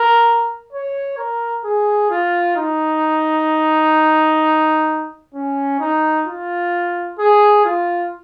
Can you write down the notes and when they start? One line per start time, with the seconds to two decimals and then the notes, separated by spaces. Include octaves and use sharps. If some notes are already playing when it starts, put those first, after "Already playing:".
Already playing: A#4
0.72 C#5
1.18 A#4
1.64 G#4
2.11 F4
2.57 D#4
5.34 C#4
5.80 D#4
6.27 F4
7.19 G#4
7.65 F4